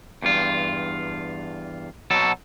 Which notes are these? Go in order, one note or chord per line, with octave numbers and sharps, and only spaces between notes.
E2 G2 F4
B2 F#3 A4